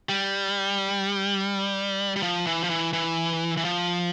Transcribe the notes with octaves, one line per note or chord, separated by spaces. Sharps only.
G3
G3
F3
E3
F3
E3
E3
E3
F3